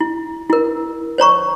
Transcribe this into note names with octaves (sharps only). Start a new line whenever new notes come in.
E4
E4 A#4
C5 C#5 A#5 C#6